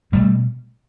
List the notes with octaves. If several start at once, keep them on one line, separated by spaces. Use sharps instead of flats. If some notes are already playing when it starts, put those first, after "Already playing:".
B2 G3 A3